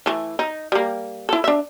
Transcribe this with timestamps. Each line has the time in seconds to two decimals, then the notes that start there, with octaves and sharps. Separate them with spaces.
0.06 E3 A3
0.39 D#4
0.72 G3 A#3
1.29 E4 A4
1.44 D4 E5